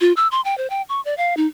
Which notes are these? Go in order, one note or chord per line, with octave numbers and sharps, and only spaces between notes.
F4
E6
C6
G5
C5
G5
C#6
D5
F5
D#4